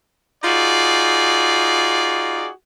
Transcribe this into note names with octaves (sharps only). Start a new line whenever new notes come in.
D#4 F4 F#4 G#4 D5